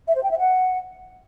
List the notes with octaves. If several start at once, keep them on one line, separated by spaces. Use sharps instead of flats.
E5
C5
G5
E5
F#5